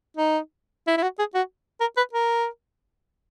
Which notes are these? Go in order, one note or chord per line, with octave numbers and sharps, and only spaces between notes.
D#4
E4
E4
F#4
G#4
F#4
A#4
B4
A#4